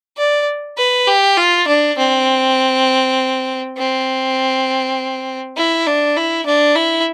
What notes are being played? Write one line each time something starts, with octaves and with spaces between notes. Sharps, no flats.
D5
B4
G4
F4
D4
C4
C4
E4
D4
E4
D4
E4